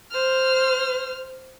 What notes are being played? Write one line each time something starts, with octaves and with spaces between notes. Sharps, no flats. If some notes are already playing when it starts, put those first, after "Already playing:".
C5 F6